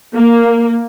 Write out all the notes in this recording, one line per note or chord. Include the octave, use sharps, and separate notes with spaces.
A#3